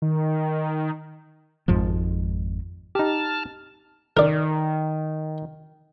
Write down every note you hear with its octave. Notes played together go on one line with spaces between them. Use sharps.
D#3
G#1 F2 G#2 F3
D#4 G4 A5 F6
D#3 A#4 D5